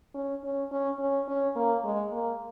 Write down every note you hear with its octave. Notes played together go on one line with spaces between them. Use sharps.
C#4
C#4
C#4
C#4
C#4
A#3
G#3
A#3